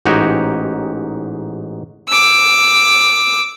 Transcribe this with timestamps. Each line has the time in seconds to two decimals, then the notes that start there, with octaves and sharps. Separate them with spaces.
0.05 A1 G#2 D#4 F#4 G4 G#5
2.09 D6 E6